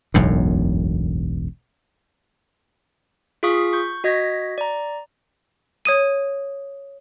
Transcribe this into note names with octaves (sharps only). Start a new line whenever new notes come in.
E1 B1 F#2 A2
F4 G#4 F5 C#6 D#6 B6
C#6 G6
F#4 D#5 G#6 A#6 B6
D5 A#5
C#5 D#6 D#7